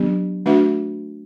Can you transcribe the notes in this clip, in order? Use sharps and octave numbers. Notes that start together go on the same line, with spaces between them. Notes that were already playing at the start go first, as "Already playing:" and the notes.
Already playing: F#3 B3 D4 G4
A3 D4 F#4 B4 E5